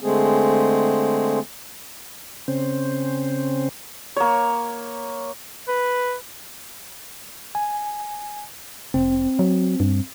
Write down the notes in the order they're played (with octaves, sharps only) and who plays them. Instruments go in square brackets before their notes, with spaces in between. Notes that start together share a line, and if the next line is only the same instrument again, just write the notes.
[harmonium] D3 G#3 A3 C4 G#4
[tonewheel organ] C#3 C4 C#4 C5
[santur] A#3 C#5
[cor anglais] B4
[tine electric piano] G#5
[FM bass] F1 [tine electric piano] C4
[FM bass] F#3
G2